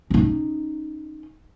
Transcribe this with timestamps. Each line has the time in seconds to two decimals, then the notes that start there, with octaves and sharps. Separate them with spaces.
0.10 C#4 D#4